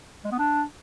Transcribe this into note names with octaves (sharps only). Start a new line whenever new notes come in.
G#3
B3
D4